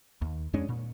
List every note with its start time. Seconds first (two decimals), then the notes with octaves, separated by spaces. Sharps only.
0.22 D#2
0.53 F2 G#3 C#4 D4
0.69 A#2